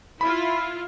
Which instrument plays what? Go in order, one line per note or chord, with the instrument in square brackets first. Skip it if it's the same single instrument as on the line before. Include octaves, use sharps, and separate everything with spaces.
[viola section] E4 F4 [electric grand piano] B5